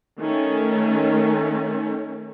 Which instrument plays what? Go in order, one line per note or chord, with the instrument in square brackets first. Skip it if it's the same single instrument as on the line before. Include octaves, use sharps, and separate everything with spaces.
[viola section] D#3 A3 C#4